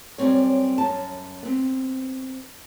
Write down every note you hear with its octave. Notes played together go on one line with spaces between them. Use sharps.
F#2 G3 C4 C#5
F#2 A5
B3 C4